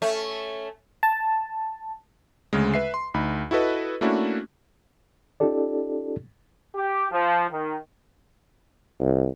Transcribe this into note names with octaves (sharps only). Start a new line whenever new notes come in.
A3 C#4
A5
D2 C#3 G#3
B4 E5 C7
C6
D2 D#4 B5
E4 F#4 A4 B4 D#5
A3 A#3 C#4 D4 E4 F#4
C#4 D#4 F4 G4 A4 D5
G4
F3
D#3
C2